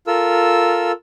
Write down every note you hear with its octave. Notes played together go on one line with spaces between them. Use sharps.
F4 A4 A#4 E6